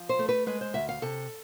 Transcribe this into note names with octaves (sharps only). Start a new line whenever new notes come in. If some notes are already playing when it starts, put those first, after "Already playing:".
Already playing: F3
C5
A3 A4
B4
G#3 B4
C5
D2 E5
F5
C3 A4